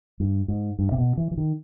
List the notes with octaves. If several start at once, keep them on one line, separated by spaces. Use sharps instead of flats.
G2
G#2
G2
C3
B2
E3
E3
D#3